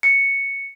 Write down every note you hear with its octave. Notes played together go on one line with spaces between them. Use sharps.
C#7